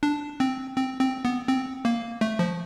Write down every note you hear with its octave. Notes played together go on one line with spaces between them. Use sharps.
D4
C4
C4
C4
B3
C4
A#3
A3
F3